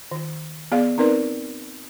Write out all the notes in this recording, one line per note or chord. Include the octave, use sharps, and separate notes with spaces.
D#3
B3 G#4 D5 F5
C4 D#4 A#4 B4 D5